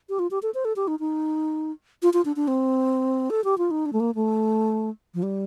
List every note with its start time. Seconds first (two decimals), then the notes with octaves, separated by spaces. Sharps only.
0.09 G4
0.19 F4
0.31 G4
0.43 A4
0.54 C5
0.65 A4
0.76 G4
0.88 D#4
1.00 D#4
2.02 F4
2.13 F4
2.25 D4
2.36 D4
2.48 C4
3.30 A4
3.44 G4
3.58 F4
3.71 D#4
3.86 D4
3.93 A3
4.00 A#3
4.15 A3
5.14 F3
5.23 G3